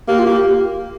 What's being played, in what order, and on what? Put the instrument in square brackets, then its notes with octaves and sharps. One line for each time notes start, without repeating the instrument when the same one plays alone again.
[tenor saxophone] A#3 [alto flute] G4
[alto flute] F4
[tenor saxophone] A#3 [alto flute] G4